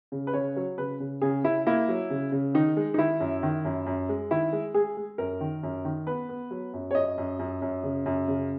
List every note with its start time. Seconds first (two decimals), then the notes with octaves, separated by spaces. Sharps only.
0.12 C#3
0.27 B4
0.34 C#3 C#5
0.57 F#3
0.78 C#3 B4
1.00 C#3
1.22 C#3 G#4
1.44 C#3 E4
1.67 A#3 E4
1.88 F#3
2.10 C#3
2.32 C#3
2.54 D#3 D#4
2.77 G#3
2.94 D#4
2.98 D#3 E4
3.20 F#2
3.43 D#3
3.65 F#2
3.86 F#2
4.09 G#3
4.31 D#3 E4
4.53 G#3
4.74 G#3 G#4
4.97 G#3
5.18 F#2 A#4
5.41 D#3
5.63 F#2
5.85 D#3
6.07 B3 B4
6.29 B3
6.51 F#3
6.74 F#2
6.91 C#5
6.95 F#2 D#5
7.18 F#2
7.39 F#2
7.62 F#2
7.83 C#3
8.06 F#2
8.28 C#3